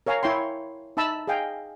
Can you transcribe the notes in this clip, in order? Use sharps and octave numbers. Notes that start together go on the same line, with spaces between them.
A#4 C#5 F5 G#5 A#5
E4 C#5 G5 C6
D#4 E5 A5 B5 E6
G#4 D#5 F5 G5 G#5